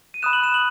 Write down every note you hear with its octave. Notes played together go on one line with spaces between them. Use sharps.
D#7
B5 D#6 F#6 E7
F#7
E7
F#7